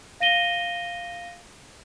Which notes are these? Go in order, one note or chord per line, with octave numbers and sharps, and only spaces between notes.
F5 A#6 D#7 G7